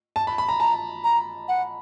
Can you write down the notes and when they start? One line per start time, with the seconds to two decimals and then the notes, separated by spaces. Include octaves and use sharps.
0.16 A5
0.27 B5
0.38 B5
0.49 A#5
0.60 A5 A#5
1.04 A#5
1.48 F#5